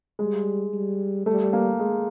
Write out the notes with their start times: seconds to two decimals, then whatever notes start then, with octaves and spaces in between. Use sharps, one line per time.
0.19 G3 G#3
0.74 G3
1.26 G3 A3
1.53 A#3
1.79 G#3